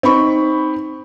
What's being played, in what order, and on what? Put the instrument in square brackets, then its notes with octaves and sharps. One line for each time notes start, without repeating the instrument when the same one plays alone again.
[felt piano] C4 D#4 B5 C#6